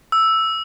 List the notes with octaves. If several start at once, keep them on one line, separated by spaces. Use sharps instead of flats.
E6